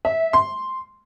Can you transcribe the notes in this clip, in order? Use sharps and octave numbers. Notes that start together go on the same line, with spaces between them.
E5
C6